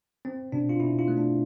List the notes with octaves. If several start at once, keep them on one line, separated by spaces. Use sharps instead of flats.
C4
B2 D4
F4
B2 E4
F4
A3
D4